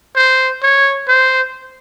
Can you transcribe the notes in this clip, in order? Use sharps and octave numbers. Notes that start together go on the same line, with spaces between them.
C5
C#5
C5